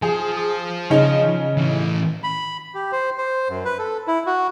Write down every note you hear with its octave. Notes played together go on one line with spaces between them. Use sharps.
F3 G#4
C#3 C#4 D#4
A2 E3
B5
G4
C5
C5
F#2
B4
A4
E4
F#4